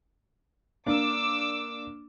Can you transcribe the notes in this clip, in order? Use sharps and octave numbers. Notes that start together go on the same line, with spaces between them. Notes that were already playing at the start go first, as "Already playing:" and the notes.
A#3 D4 D6 E6